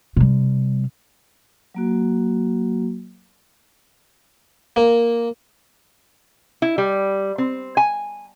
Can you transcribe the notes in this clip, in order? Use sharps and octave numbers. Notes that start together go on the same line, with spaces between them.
C3 G3
F#3 A#3 F#4
A#3
E4
G3
C4
G#5